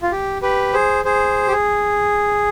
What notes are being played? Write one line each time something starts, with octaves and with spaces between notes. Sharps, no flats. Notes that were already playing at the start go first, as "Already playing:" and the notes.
F4
G4
G4 B4
G#4 C5
G#4 C5
G4
G#4